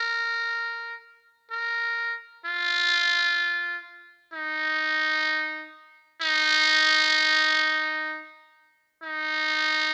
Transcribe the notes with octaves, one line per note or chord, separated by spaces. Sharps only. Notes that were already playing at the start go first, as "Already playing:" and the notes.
Already playing: A#4
A#4
F4
D#4
D#4
D#4